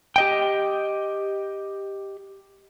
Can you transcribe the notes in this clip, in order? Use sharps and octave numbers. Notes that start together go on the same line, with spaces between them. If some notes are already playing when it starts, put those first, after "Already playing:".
G4 D#5 G5